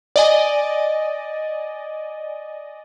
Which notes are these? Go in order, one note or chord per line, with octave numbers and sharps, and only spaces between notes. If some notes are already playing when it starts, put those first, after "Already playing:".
D5 D#5 G#5